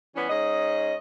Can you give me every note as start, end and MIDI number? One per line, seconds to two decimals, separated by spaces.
0.15 0.29 52
0.15 0.29 55
0.15 0.29 59
0.15 0.29 61
0.30 0.95 44
0.30 0.95 61
0.30 0.95 75